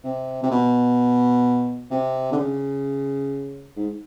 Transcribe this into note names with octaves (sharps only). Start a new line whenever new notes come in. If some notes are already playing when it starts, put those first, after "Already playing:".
C3
C3
B2
C3
D3
C#3
G#2